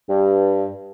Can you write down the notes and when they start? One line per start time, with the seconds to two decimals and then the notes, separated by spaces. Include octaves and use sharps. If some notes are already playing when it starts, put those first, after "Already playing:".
0.09 G2